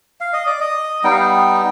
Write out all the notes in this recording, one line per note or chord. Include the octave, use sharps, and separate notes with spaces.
F5
D#5
D5
D#5
G3 B3 D#4 G5
F5
G5